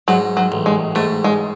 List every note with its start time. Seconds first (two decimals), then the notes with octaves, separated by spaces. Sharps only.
0.08 G#2 F#3
0.37 F#3
0.52 A1
0.66 G#3
0.95 G#2 A3
1.24 G#3